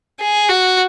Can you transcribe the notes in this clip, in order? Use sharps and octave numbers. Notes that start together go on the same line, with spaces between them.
G#4
F#4